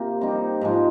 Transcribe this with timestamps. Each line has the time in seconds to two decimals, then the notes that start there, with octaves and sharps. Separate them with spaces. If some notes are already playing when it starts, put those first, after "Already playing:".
Already playing: C3 A#3
0.21 G3 C4 D#4 G4
0.61 G#2 F3 G#3